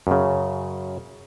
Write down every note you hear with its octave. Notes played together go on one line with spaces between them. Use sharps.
F#2 C#3